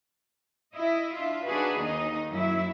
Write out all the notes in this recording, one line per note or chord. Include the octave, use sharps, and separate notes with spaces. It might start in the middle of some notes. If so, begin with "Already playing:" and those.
E4 D#5
D4 F4 E5
D4 D#4 F#4 G#4 B4
D#2 D#3 D#4 D#5
F#2 F#3 E4 E5